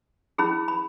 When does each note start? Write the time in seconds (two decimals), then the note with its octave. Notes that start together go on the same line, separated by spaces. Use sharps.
0.38 C#4 E4 G#4 B5
0.68 B5